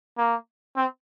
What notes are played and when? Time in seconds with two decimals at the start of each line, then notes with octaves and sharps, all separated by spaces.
0.18 A#3
0.77 C4